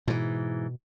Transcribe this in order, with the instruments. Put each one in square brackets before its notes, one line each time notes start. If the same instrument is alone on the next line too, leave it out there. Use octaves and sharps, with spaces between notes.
[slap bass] G#2 E3 [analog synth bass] B2